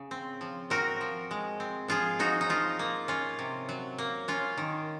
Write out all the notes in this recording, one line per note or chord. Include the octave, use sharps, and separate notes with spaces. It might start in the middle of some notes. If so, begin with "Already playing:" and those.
Already playing: C#3
C4
F3
C4 F#4 A#4
F3
G#3
C4
F3 F4 G#4
F3 D#4 F#4
D#4
F3 F4
A#3
C#4 F4
C3
F#3
A#3
C#4 F4
D#3